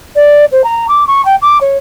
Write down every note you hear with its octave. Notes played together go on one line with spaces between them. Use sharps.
D5
C5
A#5
D6
C#6
G5
D6
C#5